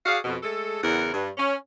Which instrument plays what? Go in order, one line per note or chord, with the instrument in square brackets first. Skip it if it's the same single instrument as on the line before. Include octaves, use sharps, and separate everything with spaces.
[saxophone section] F#4 G#4 D5 F5
F2 B2
G#3 A3 A4
E2 C#3 E4 A#4 F#5
G2
C#4